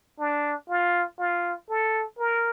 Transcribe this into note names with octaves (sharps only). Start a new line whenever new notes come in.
D4
F4
F4
A4
A#4